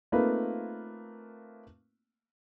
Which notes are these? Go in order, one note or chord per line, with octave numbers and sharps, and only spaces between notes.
A3 A#3 C4 D#4 F4 B4